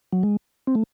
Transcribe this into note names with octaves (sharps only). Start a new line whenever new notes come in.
F#3
G#3
C4
A3